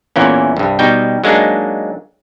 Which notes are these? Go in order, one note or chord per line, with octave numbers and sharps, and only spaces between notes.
E2 A#2 E3 A#3 C#4
C2 G2
B2 G3 D#4 G5
F#3 G#3 A#3 D4 D#4